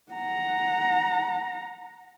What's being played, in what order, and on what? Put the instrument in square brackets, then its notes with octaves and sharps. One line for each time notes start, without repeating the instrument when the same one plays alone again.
[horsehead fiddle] F#5 A#5